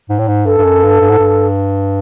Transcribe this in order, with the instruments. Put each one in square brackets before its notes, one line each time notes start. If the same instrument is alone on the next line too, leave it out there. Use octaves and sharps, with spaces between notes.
[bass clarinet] G#2
A2
G#2
[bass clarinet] G2 [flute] A4
[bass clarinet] G2
F#2
G2
G2
G#2
G2